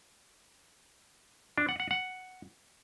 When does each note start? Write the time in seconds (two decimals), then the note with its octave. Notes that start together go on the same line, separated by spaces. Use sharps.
1.58 D4
1.69 F#5
1.80 F#5
1.91 F#5